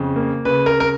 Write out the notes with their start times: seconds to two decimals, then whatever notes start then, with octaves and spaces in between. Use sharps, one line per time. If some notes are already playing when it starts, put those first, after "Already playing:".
Already playing: F2 C#3
0.16 A#3
0.45 C#3 B4
0.66 A#4
0.80 A#4